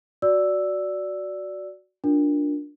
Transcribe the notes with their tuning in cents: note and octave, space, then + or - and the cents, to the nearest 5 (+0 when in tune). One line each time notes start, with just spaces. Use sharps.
F#4 +0 D5 -10 E6 +0
D4 +0 F4 +30 A#4 +10